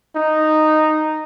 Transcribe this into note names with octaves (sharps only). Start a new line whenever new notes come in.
D#4